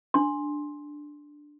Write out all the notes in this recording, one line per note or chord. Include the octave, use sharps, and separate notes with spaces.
D4 C6